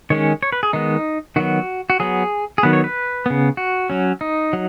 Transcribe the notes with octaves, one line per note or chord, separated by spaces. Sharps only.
D#3 G#3 C#4 C#5
C#5
B4
G#4
D#3 G#3 B3 D#4
D#3 F#3 B3 F#4
F#4
F#3 B3 G#4
G#4
D#3 F#3 B3 B4
C#5
B4
C#3 B3
F#4
F#3 C#4
D#4
F#3